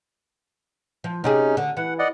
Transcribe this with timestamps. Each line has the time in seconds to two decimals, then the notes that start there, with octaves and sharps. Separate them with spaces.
1.04 F3
1.24 C3 C#4 D#4 G4 G#4
1.57 D3
1.77 E3 F#5
1.99 D5 D#5 F#5